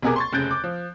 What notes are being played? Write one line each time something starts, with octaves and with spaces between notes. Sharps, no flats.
B1 C3 B3 G#4 A#4 D6
C6 C#6 A6
F1 C#3 F#6 G6 A6 D7
D6
F3